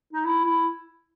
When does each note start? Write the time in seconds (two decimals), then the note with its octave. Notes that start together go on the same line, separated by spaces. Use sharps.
0.13 D#4
0.25 E4
0.45 E4